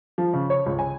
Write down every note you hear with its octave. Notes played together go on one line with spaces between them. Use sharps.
F3
C#3
C#5
C#2
G#5